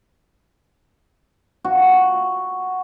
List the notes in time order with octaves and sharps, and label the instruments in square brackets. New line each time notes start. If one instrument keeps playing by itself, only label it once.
[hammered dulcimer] F#4